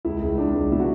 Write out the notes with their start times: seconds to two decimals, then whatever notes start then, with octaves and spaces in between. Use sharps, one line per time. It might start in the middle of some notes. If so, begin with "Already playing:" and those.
0.05 C#2 E4
0.22 C#2
0.38 C#2 D4
0.55 C#2
0.72 B2 E4
0.80 F#4